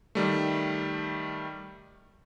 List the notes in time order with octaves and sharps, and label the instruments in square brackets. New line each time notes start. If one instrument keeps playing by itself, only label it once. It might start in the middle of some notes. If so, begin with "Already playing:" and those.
[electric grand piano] D#3 G3 A3